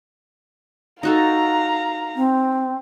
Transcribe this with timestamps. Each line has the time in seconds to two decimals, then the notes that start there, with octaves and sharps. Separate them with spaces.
1.03 D#4 F#4 A4 F5 A#5
2.15 C4